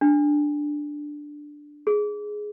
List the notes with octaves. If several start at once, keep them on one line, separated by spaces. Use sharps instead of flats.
D4
G#4